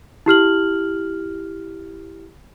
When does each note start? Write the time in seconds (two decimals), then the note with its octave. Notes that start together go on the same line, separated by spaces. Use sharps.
0.26 E4 G4 F6 F#7